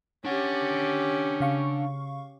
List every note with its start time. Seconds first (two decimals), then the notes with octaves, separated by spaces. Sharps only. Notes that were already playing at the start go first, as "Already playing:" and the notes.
0.25 C#4 D4 G4 F#5
1.40 C#3 F5 C#6